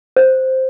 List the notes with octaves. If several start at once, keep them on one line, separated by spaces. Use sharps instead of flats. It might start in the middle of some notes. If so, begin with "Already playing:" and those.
C5